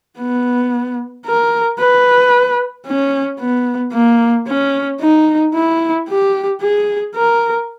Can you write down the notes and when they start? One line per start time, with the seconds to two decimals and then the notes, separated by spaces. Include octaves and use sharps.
0.18 B3
1.26 A#4
1.79 B4
2.86 C#4
3.39 B3
3.93 A#3
4.47 C#4
5.01 D#4
5.54 E4
6.09 G4
6.61 G#4
7.15 A#4